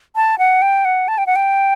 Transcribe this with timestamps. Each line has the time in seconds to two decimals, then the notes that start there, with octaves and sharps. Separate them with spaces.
0.16 A5
0.39 F#5
0.62 G5
0.85 F#5
1.08 A5
1.18 G5
1.27 F#5
1.36 G5